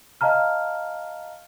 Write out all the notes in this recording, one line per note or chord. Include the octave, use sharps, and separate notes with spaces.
D#5 F5 A5 A#5 F6